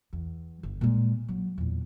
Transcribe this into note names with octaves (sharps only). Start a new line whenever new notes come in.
E2
G1
A#2 G#3
F#3
E2 A#2